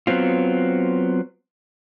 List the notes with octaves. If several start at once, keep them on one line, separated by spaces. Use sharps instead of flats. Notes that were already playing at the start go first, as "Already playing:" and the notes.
F#3 B3 C4 F4